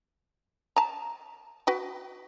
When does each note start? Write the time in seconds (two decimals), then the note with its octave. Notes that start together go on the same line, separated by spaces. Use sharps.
0.76 A5 A#5
1.67 F#4 B4 G5